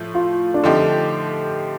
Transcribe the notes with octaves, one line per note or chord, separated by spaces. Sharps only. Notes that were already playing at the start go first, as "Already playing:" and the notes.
Already playing: A2 F3 A3
F4
D4
D3 F3 A3 C4 D#4 G4